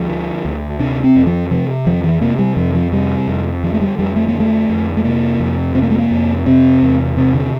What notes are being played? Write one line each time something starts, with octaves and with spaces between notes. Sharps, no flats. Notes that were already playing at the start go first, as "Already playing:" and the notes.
Already playing: D2 F3
D3
D2
C3 D4
C4
F2
F3
C3 F3
F2 F3
E3
C3 A#3
G3
F2 F3
F3
C3 G3
F2
D3 F3
A3
G3
F2 G3
A3
A#3
D3
A3
F2
A3
C3 A#3
F2
C3 C4
A#3
A3
A#3
F2
C3 C4
E2
C3 C4
D3